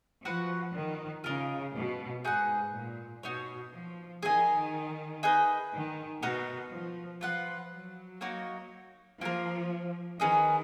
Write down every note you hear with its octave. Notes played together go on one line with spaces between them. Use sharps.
F3 F#4 B4 F#5
D#3
C#3 F4 A#4 D#5
B2
G#2 D#4 G#4 B4 F#5
A#2
B2 D#4 F#4 C#5
F3
D#3 G#4 D#5 G#5
D#4 G#4 B4 D#5
D#3
B2 B3 D#4 F#4 A#4
F3
F3 F4 B4 F#5
F#3
A#3 D#4 F#4 C#5
F3 A#3 F4 A#4
D#3 C#4 G#4 B4 D#5